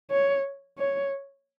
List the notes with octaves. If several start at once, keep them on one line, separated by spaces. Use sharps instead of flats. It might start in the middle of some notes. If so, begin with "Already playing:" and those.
C#5
C#5